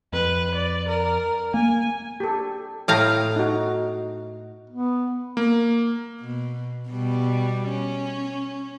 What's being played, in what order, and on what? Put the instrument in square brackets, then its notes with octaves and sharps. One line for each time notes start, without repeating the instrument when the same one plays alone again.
[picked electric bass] F2 [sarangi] B4
[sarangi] D5
A#4
[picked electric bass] A#3 [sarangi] G#5
[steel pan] G4 A4
[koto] A2 F5 A#5 [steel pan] G5 D#6
[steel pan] D#4 F#4
[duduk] B3
[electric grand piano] A#3
[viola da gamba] B2
B2 G3
C#4